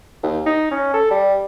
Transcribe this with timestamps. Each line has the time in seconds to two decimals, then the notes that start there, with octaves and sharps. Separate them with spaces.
0.23 D#2
0.46 D#4
0.71 C#4
0.94 A4
1.11 G3